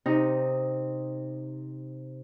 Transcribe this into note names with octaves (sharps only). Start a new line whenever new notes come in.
C3 D#4